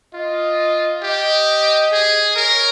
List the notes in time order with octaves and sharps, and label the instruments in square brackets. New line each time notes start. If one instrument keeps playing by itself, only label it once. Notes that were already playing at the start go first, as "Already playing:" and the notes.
[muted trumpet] F4 [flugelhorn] D#5
[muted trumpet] G4 [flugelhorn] D#5
[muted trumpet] G#4
[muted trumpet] A#4 [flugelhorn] C#5